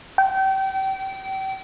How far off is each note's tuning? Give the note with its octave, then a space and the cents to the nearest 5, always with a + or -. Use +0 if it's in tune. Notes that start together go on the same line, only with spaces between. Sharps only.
G5 -30